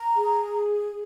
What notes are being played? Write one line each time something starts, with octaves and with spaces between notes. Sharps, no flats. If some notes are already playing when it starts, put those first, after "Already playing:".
Already playing: A#5
G#4